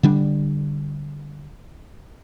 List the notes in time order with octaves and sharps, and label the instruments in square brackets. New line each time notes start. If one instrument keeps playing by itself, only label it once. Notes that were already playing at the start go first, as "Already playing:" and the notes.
[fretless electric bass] D3 G3 D4